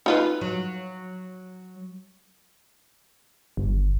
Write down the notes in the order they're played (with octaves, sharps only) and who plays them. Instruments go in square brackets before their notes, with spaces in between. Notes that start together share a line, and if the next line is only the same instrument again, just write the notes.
[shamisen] D#4 F4 B4
[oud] F#3
[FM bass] G1